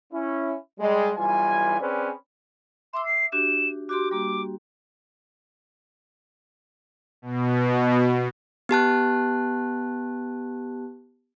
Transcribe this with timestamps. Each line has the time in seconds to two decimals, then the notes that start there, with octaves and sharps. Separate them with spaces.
0.11 C#4 E4
0.78 G3 G#3
1.16 B1 E3 G3 F4 G#5
1.80 C4 C#4 G#4 B4 C5 D5
2.93 E5 C6 D6 E6
3.05 C7
3.32 D4 F#4 G4 E7
3.89 F#4 G4 C6 D6
4.11 G3 A#3 D6
7.22 B2
8.69 B3 G4 A5 F#6